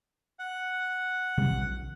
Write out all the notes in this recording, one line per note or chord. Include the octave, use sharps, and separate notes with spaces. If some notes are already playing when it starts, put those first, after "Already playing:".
F#5
C3 D#3 G3
A#1